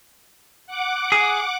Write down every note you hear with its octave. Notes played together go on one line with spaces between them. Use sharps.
F#5 D6
G#4